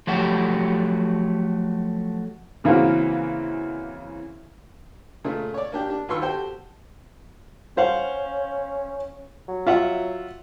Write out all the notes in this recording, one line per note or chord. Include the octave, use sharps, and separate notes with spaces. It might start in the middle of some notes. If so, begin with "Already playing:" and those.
F3 F#3 A3 F#4 G4
C#3 E3 A#3 C4 C#4 F#4
A#2 C#3 A3
C#5 D5
A#3 D4 G4
D4
D#2 F4 B4 C6 C#6 E6
F#4 G4 A4 C5 G5
C#4 C5 F5 F#5
F#3
F4 E5 F#5